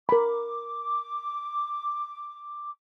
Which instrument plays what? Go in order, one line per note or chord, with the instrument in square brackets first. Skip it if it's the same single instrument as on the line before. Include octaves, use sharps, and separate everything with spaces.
[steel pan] A#4 B5 [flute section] D6